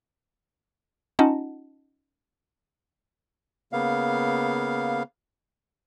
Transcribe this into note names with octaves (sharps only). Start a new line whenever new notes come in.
C#4 D#4 F4 D#5 F#5 A5
C#3 A#3 B3 F5